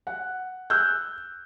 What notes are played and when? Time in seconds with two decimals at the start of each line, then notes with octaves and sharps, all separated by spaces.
0.07 F#5
0.70 E6 F#6 G6